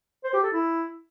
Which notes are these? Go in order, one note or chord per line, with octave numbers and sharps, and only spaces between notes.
C5
G4
A4
E4